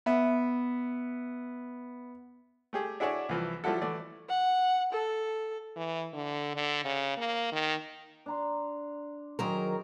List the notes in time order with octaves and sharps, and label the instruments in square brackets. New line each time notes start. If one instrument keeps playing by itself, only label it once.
[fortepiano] B3 E5
A3 G4 G#4
D4 E4 F#4 G#4 C#5 D5
C2 E3 F3
F3 G3 E4 F#4 A4
E3 A3 D5
[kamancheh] F#5
A4
[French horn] E3
D3
D3
C#3
A#3
D#3
[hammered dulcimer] D4 A#5 C6
[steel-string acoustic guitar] D#3 F#3 A#4 [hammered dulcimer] G#4 C5